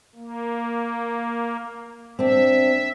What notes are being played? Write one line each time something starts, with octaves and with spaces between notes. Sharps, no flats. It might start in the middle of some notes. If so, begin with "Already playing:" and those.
A#3
C4 D4 E5